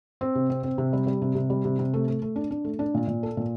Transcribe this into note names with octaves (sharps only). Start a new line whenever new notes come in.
C4
C3
C4
C4
C3
G3
G3
C3
C3
G3
C3
C3
A3
A3
A3
D4
D4
A3
D4
A#2
A#2
A4
A#2